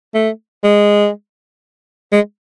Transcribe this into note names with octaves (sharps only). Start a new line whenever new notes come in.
A3
G#3
G#3